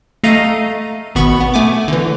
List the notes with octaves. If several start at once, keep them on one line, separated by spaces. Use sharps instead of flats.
A3 A4 D#5 F5 A#5 D#7
G#1 B2 B3 B5 C#6
B3
A3 G#5 D6
D3 E3